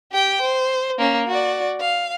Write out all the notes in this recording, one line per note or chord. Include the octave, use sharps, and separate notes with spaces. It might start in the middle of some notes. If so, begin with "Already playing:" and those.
G4 G5
C5
A#3 C#4
F#4 D5
F5